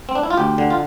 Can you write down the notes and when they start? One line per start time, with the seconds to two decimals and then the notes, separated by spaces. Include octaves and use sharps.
0.09 C4
0.15 D4
0.23 E4
0.30 F4
0.37 D2 G4
0.58 D3
0.70 F4